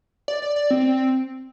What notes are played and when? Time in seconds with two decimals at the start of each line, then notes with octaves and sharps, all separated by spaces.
0.28 D5
0.42 D5
0.56 D5
0.70 C4